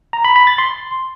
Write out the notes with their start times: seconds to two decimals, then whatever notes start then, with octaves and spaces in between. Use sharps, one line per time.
0.13 A#5
0.25 B5
0.36 B5
0.47 A6
0.58 C6